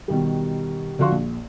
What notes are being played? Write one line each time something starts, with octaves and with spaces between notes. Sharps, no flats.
B2 D#3 G3
D3 F3 F#4 F5 C6 C#6
A#1